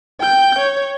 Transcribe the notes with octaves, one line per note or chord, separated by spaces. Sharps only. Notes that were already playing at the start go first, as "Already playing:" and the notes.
G5 G6
C#5